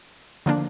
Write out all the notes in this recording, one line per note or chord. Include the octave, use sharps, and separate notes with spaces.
D3 F3 A#3 D4